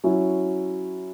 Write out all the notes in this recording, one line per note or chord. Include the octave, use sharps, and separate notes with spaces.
F#3 C#4 E4